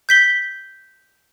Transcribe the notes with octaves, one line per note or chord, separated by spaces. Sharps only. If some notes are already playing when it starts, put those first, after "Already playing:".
G6 B6 G7